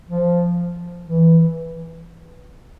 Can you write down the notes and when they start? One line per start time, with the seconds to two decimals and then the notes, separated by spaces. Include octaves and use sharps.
0.09 F3
1.08 E3